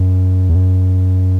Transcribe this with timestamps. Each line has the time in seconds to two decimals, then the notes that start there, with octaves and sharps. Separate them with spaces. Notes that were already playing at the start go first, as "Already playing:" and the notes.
Already playing: F#2
0.49 E2
0.55 F#2